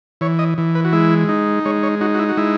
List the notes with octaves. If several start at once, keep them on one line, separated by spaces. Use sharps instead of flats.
E3 C#5
D#5
E3
B4
F#4
G#3 E4
D#4
G#3 C#5
C#5
D#4 F#4
F#4
E4
F#4
G#3 E4